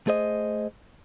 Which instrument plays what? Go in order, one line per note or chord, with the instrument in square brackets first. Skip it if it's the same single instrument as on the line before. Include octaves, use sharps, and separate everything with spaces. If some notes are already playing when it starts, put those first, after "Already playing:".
[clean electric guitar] A3 G#4 C5 D#5